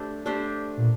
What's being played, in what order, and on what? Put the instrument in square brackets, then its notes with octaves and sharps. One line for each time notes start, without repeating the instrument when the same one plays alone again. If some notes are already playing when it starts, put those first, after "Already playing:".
Already playing: [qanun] A3 D4 G4 C5
A3 D4 G4 C5
[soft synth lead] A#2